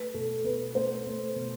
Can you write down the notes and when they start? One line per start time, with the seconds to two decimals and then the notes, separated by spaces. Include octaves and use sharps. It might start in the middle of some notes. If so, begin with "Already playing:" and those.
Already playing: A3 B4
0.14 B2 A4
0.44 B2 B4
0.75 A3 C5
1.06 A3
1.36 B2